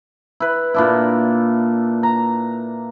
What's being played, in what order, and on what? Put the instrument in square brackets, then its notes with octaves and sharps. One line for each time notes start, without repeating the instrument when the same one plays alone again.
[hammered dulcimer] E4 B4
A#2 D4 E4
A#5